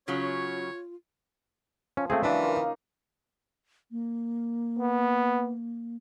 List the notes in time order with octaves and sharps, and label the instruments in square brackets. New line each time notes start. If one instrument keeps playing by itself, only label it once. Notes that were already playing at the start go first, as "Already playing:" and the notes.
[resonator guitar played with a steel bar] C#3 F#3 [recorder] C#4 [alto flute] F4 [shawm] C#5
[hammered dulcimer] F3 [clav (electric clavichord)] C#4
[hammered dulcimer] C#3 G#3 [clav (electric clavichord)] A3 C4 G#4
[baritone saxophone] E3 [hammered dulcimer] F#3 A#3 [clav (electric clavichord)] D4 E5
[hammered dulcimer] A#3 F4
D#4
[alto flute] A#3
[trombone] B3